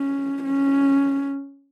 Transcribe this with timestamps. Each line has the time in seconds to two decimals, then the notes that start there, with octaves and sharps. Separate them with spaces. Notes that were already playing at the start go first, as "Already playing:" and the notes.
Already playing: C#4
0.44 C#4